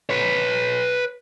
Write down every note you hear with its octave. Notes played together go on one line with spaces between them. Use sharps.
B4 C#5